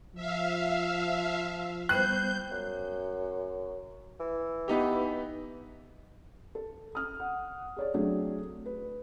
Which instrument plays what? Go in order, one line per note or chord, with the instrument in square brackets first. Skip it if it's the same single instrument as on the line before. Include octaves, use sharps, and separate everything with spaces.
[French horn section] F3 [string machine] E5 F5
[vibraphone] G3 B3 C5 [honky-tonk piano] F#6 [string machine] G6
[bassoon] F#2
E3
[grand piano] B3 D#4 G4
[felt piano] A4
D#6 F6
F#5
G#4 C#5 D5
F#3 A3 C4 D4 G#4
B4